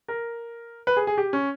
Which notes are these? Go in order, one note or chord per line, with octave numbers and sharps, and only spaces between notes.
A#4
B4
G#4
G#4
G4
C#4